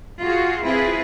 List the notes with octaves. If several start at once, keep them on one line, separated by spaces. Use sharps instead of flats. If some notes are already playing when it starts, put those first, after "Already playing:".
F4 F#4 G#4
C4 E4 F4 G#4 B4